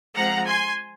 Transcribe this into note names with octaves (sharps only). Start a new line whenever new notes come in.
F3 G#3 C4 F#5 A#5
G#5 C6